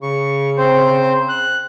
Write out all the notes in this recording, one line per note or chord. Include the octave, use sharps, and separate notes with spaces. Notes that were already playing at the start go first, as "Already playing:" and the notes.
C#3 C#6
C4 C5
F#6